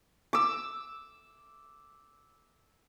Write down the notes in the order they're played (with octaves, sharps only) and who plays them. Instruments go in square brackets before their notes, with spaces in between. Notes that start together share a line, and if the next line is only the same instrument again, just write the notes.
[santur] D6 E6